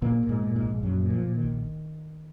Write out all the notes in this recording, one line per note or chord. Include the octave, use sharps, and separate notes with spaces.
A#1 A#2 A#3
A#2
G#2 G#3
A#2
G#2 G#3
A#1
A#1 F#2 F#3
A#2
F3
A#2
D#3
A#1